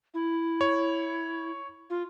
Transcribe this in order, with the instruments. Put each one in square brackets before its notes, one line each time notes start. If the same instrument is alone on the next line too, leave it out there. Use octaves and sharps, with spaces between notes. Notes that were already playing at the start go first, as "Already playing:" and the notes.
[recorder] E4
[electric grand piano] C#5
[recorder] F4